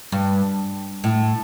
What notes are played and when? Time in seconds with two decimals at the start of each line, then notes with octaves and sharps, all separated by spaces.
0.12 G2
1.04 A2